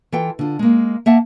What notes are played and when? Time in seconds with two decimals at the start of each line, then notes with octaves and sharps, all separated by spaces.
0.12 E3 F4 A4 G5
0.39 D3 F4
0.59 G#3 A#3
1.06 A#3 E5 F#5 A5